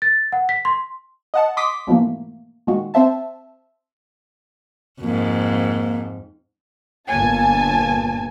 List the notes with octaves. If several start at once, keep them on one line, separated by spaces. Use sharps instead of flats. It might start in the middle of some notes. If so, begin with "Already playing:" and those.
A6
F#5
B6
C6
D#5 F#5 A5
C6 D6 D#6 B6
G#2 B2 E3 F3 A3 A#3
A#2 D#3 G#3 F#4
C4 C5 E5 A5
F2 G#2 A#3
G1 A#2 G#5 A5